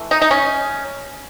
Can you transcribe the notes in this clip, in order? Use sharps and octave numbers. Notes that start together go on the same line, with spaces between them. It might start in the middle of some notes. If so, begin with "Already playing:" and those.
Already playing: E3 A3
D#4
D#4
C#4